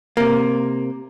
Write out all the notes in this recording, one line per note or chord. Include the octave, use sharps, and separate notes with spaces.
C3 A#3